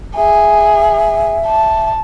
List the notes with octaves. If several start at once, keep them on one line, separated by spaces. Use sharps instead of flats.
G#4 E5
A5